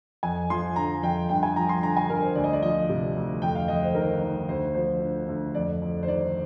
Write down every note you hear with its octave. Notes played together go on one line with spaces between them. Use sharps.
F2 G#5
F3 C6
D3 A#5
F2 G5
G2 G5
G#5
F3 A#5
C6
D3 A#5
G#5
G2 A#4
C5
D2 D5
D#5
D5
F3 D#5
C3
D2
F2 G5
F5
F2 D#5
C5
D#3 A#4
D#3
D2 C5
F3 C5
D3
D2
F2 D5
F2
C5
D#3 D5